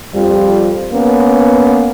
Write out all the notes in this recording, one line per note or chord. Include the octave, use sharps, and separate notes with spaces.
F2 F3 G3
A#3 B3 C#4